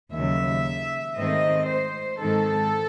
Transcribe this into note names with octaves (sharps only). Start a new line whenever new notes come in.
D#2 C#3 F#3 E5
G#2 D#3 A3 C4 D#5
C5
G#2 D#3 G#3 C4 A4